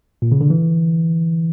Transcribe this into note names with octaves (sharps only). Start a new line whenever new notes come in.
A#2
C#3
D3
E3